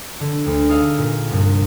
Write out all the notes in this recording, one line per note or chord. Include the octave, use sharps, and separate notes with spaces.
D3
D2
D#4 G#4 A4 D#5 F5
A#2
C2 G2